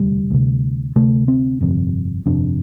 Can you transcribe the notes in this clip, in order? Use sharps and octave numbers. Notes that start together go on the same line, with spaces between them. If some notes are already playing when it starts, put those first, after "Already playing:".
Already playing: E1 D2 C3 G3
D2 C3
D2 C3 A3
C4
G1 F2 C3
G1 F2 C3 D4